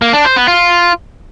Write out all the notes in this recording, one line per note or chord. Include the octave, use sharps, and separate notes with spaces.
A#3
D4
C5
B3
F4